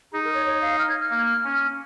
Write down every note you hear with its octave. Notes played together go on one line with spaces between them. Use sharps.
D#4 G#4
A#4
C#5
C#5
F5
F6
G#6
F6
A#3
C#4